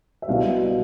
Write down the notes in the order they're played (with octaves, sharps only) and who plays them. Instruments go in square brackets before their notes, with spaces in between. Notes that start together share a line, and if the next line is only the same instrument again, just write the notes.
[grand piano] E5
C2 B2 G3 F5